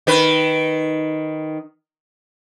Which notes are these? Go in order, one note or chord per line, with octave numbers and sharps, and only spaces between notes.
D#3 B4